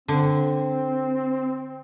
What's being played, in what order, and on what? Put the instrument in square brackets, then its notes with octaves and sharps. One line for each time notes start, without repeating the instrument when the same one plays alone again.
[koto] D3 [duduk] C4